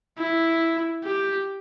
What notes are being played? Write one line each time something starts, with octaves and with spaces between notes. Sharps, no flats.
E4
G4